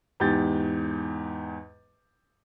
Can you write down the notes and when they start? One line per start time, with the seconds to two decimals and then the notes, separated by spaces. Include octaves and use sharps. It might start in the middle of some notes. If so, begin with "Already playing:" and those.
0.20 E2 G#2 G4 G6 A6